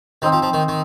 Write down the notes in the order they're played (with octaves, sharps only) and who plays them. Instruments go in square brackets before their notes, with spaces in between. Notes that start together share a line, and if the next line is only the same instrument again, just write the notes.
[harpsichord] D#3 [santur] C4 D#4 C5
[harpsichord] F3
F3
D#3
D#3